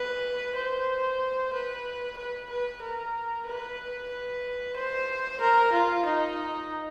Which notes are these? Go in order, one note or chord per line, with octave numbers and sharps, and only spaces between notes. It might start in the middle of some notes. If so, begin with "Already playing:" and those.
Already playing: B4
C5
B4
B4
B4
A#4
B4
C5
A#4
F4
D#4